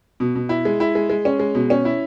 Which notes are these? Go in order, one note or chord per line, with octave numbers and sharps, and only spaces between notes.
B2
B2
E4
G#3
E4
G#3
G#3
C#4
G#3
B2
C#4
E4